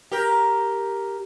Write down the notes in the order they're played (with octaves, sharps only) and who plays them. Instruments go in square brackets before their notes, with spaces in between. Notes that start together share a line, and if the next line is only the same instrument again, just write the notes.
[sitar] G4 A#4